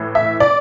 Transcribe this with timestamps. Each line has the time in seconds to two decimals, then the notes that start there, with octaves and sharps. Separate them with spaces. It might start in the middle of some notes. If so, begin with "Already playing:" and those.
Already playing: A2 E3
0.15 E5
0.40 D5